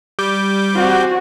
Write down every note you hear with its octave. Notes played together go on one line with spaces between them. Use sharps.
G3 D6 G6
C4 F#4 G#5